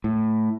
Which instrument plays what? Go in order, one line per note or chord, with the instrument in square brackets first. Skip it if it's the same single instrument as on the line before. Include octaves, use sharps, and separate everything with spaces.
[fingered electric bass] A2